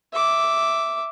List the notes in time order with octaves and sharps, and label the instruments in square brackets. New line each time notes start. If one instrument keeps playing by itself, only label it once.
[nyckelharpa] E5 D6